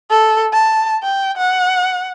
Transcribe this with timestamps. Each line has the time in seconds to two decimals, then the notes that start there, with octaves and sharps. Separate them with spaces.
0.10 A4
0.53 A5
1.03 G5
1.37 F#5